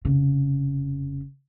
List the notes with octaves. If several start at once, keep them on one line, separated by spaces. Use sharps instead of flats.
F1 C#3